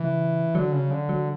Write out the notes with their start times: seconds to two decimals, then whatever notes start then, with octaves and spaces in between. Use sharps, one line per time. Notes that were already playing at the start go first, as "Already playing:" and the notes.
Already playing: C#3 E3
0.54 D3 F#3
0.72 C#3
0.91 D3
1.09 F#3